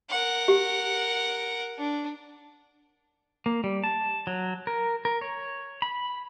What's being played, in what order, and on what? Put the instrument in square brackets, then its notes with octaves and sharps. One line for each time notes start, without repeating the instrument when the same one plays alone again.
[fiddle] A#4 F#5
[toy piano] G4
[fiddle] D4
[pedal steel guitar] A#3
G3
A5
F#3
A#4
A#4
C#5
B5